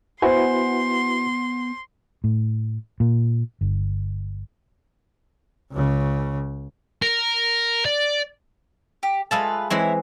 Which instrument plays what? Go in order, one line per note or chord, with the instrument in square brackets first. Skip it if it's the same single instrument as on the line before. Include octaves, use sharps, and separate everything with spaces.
[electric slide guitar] B3 F#5 G#5 [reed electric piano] E4 F#4 B4 [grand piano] C5 [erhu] C6
[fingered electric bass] A2
A#2
G1
[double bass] C#2 C#3
[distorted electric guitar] A#4
D5
[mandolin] G4
[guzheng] G#3 A4 A5 [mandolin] A3 F4 B4
[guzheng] E3 G#3 C4 [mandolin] E4 C#5